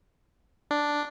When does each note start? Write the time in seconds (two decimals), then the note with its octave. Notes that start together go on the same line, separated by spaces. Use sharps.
0.71 D4